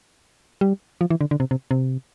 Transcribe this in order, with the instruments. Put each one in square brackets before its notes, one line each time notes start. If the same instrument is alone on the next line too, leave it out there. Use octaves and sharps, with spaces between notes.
[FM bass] G3
F3
E3
D3
D3
C3
C3
C3